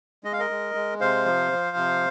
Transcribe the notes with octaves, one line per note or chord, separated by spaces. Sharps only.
G#3 D#5
F5
A#4 D#5
G#3
G#3
C3 C5 F5
F3
F3
C3